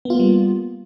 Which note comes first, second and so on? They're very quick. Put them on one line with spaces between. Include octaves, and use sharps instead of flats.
B3 F4 A#3 G3